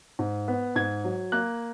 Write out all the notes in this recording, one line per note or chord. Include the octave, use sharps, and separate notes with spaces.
G#2
B3
G#2 G#6
F#3
A#3 F#6